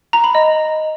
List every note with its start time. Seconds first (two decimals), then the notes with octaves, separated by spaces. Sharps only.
0.13 A#5
0.24 B5
0.35 D#5